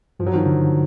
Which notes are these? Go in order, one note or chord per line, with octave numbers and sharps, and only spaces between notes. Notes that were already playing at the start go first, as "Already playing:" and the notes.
G2 F3
F#3
D#3 F3
D3